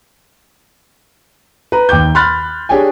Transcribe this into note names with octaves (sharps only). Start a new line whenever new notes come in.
B4 A#5
D#2 G5 D6 G6
B5 C6 F6 F#6 A6
D4 G4 G#4 C#5 G5 G#5